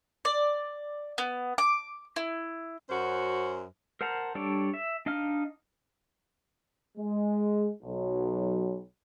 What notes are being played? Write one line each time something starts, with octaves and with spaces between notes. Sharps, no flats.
D5
B3
D6
E4
F#2 C#4 F#4 C5
A#4 C5 F#5 A5 A#5
G3 D4 A4 C#5 D5
E5
D4 D#4 D#5 F5 F6
G#3
B1 F#3